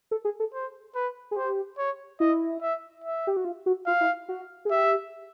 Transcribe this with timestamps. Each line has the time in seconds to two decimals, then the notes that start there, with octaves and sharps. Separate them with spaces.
0.11 A4
0.25 G#4
0.40 A4
0.54 C5
0.95 B4
1.31 G#4
1.36 G4 C5
1.78 C#5
2.20 E4 D#5
2.61 E5
3.04 E5
3.27 G4
3.37 F#4
3.45 F4
3.66 F#4
3.86 F4 F5
4.00 E4
4.29 F#4
4.65 G#4
4.70 G4 E5